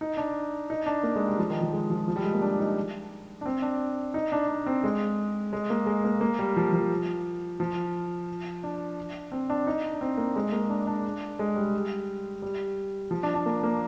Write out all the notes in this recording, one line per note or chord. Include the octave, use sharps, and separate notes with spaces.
D#4
D4
D#4
D4
A#3
G#3
G3
F3
D#3
F3
G#3
F3
F3
G3
G#3
A#3
D4
D#4
D4
C4
D4
D#4
D4
D4
C4
G#3
G#3
A#3
G#3
A#3
A#3
G3
F3
F3
F3
D4
C4
D4
D#4
D4
C4
A#3
G#3
A#3
D4
D4
G#3
G3
G3
F3
D4
D4
A#3
A#3